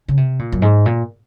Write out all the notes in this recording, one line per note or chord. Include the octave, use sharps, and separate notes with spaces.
C#3
C3
A#2
F#2
G#2
A#2